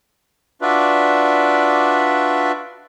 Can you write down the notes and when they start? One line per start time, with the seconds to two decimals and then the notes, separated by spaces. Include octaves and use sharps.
0.62 D4 F4 F#4 B4 D5 E5